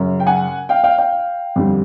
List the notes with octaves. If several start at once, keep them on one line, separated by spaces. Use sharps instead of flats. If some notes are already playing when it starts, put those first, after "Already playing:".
Already playing: F#2 C#3 F#3
G5
F#5 G#5
F5 G5
F5 G5
F5 G5
F2 D3 G3